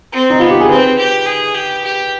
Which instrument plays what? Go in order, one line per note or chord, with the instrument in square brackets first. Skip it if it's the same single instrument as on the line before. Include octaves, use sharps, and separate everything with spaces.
[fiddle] C4
[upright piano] D#4
[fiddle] B3 [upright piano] F4
[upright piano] G4
G#4
[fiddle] C4 [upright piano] B4
[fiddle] G4
G#4
G4
G4